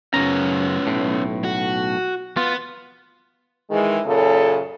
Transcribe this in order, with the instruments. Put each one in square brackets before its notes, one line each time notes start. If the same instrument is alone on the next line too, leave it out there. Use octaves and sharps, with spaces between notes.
[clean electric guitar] F#2 C#3 A#5 [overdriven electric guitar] B3 C#4
[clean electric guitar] B1 A2
[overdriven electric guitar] F#4
[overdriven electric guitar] B3 [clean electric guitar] F4
[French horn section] D#3 E3 G#3
F#2 A#2 C#3 A4